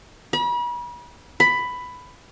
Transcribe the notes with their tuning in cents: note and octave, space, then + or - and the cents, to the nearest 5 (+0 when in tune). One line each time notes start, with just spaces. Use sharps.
B5 -40
B5 +10